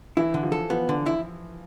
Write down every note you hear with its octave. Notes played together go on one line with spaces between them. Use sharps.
E3 E4
D3
F3
A4
F3 B3
D3
E4